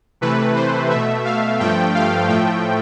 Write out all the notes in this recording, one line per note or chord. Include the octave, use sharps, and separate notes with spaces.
C3 E3 A3 B4
C5
B2 A3 E5
F5
G2 F3 A3 G5
F5
A2 F3 A3 G5